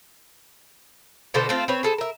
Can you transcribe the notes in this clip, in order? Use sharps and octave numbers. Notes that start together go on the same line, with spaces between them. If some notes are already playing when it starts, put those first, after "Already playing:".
B2 D3 A4 C5
A3 C4 F4
C4 B4 C#5
G#4 A4 C5
A#4 E5